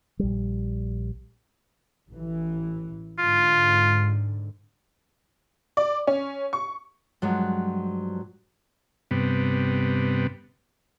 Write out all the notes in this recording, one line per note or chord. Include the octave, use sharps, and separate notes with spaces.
A#1 G3
A1 E3
G#2 D3 F4
D5
C#4
C#6
G2 F3 F#3 G#3
G2 C3 B3